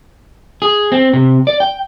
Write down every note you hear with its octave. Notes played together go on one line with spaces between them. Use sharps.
G#4
C4
C3
D5
G5